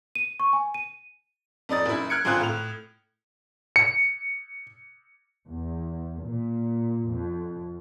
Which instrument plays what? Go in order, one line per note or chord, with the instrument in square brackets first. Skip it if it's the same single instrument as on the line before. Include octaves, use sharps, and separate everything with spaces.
[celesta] D#7
C#6
G#5
D#7
[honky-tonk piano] F2 D#4 D5 D#6 A6
F#1 E4
F6 F#6 G#6 C#7 D7
G1 C4 F4 G#5 D#6 F#6
A2 F7
[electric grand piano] C#7
[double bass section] E2
A#2
F2